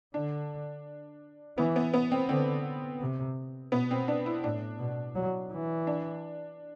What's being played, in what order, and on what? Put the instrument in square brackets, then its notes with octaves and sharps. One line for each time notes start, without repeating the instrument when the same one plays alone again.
[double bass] D3 [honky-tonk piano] D4
[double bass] E3 [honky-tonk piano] B3
[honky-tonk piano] B3
B3
C4
[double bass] D3 [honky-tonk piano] C4
[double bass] C3
[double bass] B2 [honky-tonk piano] B3
[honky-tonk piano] C4
D4
E4
[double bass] A2 [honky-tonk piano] D4
[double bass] B2
F#3
E3
[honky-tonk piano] D4